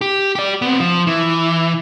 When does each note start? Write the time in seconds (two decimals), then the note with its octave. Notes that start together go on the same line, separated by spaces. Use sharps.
0.01 G4
0.35 G4 D5
0.62 B3 C4
0.80 F3
1.07 E3